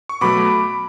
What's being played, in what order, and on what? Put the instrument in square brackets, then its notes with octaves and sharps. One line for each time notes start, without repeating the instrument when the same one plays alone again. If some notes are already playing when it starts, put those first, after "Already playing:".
[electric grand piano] C#6
B2 F#3 A3 B5 D6